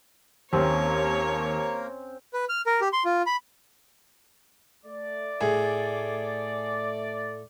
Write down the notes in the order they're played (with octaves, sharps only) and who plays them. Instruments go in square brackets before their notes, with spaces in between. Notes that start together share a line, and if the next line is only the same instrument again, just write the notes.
[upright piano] D#2 [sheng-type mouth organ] A#3 A#4 [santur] C4 C#4 [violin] C#5
[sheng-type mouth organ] B4
F6
A#4
G4
C6
F4
B5
[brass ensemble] A3 D5
[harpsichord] A2 [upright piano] G#4